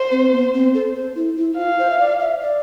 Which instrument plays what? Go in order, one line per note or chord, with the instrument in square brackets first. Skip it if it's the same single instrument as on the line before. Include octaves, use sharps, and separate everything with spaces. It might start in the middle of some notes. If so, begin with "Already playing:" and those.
Already playing: [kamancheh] C5
[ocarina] C4
B3
C4
A4
C5
E4
E4
[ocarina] F4 [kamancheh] F5
[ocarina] C5
E5
D5
E5
D5